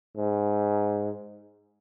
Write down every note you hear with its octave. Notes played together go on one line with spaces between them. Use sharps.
G#2